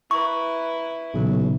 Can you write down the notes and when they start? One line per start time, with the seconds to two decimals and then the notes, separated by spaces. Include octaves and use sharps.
0.11 E4 B4 A#5 C#6
1.14 B1 A#2 C#3 E3